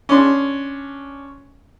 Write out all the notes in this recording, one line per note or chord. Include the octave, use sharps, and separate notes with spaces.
C#4 D4 C6